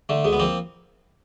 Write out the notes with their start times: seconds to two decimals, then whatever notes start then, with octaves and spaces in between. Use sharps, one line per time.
0.09 D3 A3
0.24 D2 G#3
0.33 B3
0.40 F3 A#3 C4